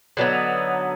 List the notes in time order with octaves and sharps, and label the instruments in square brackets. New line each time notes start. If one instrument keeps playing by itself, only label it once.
[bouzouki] D3 F#3 B3 D#4